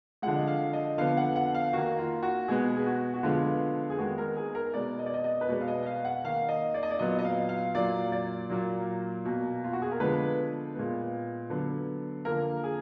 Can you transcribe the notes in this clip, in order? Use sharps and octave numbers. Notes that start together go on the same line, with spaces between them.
D3 F3 G#3 F#5
D#5
F5
D#5
D3 F3 B3 F5
F#5
F#5
F5
D#3 A#3 F#4
F4
F#4
B2 G#3 B3 G#4
G#4
F#4
F#4
D3 F3 G#3 B3 F4
G#4
D#3 G#3 B3 F#4
A#4
G#4
A#4
B2 G#3 B3 D5
D#5
D5
D#5
D#5
B4
B2 G#3 B3 D5
F5
D#5
D#5
F5
F#5
D#3 A#3 F5
D#5
D5
D#5
D5
A#2 F#3 B3 D#5
D#5
F5
F5
A#2 F#3 A#3 D5
D5
A#2 F#3 A#3
B2 A#3
F4
F#4
G#4
A#4
D3 F3 G#3 B3 B4
A#2 G#3 B3
D3 F#3 B3
D3 F3 A#3 A#4
G#4